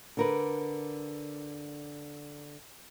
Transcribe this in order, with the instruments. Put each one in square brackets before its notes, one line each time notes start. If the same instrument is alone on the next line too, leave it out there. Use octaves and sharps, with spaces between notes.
[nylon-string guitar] D3 A#4 B4